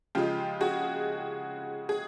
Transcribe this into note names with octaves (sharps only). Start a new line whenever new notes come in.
C#3 F3 G#3 F4 G4
F#4 G#4
G#4